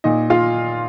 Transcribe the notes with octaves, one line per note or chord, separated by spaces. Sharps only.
A#2 D#4 D#5
F4 F5